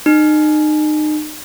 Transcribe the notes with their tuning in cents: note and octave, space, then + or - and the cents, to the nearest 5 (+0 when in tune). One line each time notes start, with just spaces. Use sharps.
D#4 -30